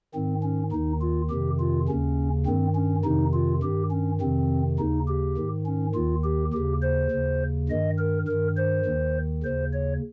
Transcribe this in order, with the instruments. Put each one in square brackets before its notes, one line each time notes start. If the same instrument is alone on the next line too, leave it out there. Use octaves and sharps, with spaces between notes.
[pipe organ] G#2 D#3 C4
C#4
D#2 D#3 D#4
F4
F2 C3 D#3 G4
F4
D#2 C#3 C#4
G2 D#3 C4
C#4
F2 C3 D#3 D#4
F4
G2 D#3 G4
C#4
F2 C3 D#3 C4
D#2 C#3 D#4
G4
G#2 D#3
C#4
D#2 D#3 F4
G4
D#2 C#3 G4
C5
D#2 C#3
G2 D#3 D#5
A#4
G2 D#3 A#4
C5
D#2 D#3
D#2 C#3 C5
C#5